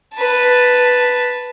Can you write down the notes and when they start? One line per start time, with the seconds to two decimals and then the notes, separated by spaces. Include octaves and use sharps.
0.14 B4 A5